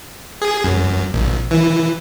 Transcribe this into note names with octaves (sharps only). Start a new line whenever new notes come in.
G#4
F#2
A#1
E3